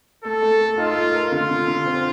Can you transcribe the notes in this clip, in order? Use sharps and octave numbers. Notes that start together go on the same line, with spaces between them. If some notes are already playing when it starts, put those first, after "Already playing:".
A3 A4
A3
A3
D#4 F4
A3
A#4
D3 F4
D3
D3
C4